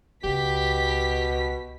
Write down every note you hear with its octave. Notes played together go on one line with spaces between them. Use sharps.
C#2 B2 G4 B6